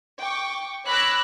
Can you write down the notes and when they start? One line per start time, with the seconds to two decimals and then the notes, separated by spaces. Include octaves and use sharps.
0.20 G5 C#6 D6
0.87 C#5 B5 D6 E6 F#6 A#6